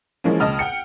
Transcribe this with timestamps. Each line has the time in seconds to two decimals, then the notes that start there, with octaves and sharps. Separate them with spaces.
0.24 E3 F3 G#3 A#3 C#4
0.40 C#2 D#5 A5 D#6 F6
0.59 F#5 G5 C#7